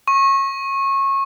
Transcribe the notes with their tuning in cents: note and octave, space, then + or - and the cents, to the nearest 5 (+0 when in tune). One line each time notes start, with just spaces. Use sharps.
C#6 -25